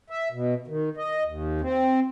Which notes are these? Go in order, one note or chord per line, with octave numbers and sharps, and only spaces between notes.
E5
B2
D#3
D#5
D#2
C4